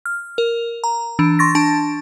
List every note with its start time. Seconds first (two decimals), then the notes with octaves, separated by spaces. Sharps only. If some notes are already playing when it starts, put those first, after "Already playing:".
0.06 F6
0.38 A#4
0.84 A#5
1.19 E3 D4
1.39 C6 C#6 A6 A#6
1.55 D4 A5